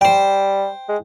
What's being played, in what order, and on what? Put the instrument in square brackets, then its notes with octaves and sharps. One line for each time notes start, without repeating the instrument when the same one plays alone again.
[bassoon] G3 [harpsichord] C5 G5
[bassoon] G#3